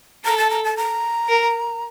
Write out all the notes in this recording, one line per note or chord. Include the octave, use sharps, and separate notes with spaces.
A4 A#5
A5
A#5
A5
A#5
A#4